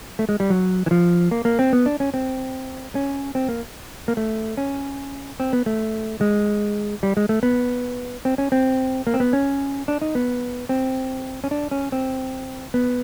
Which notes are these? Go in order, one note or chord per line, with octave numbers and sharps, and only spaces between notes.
A3
G#3
G3
F#3
E3
F3
A#3
A#3
C4
B3
D4
C#4
C4
C#4
C4
A#3
A#3
A3
C#4
C4
B3
A3
G#3
G3
G#3
A3
B3
C4
C#4
C4
A#3
C4
B3
C#4
D4
D#4
B3
C4
C#4
D4
C#4
C4
B3